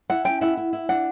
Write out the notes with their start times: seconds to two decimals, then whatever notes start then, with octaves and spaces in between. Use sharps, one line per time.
0.10 E4 F#5
0.25 C#4 G5
0.41 E4 F#5
0.57 E4
0.73 E4
0.89 D4 F#5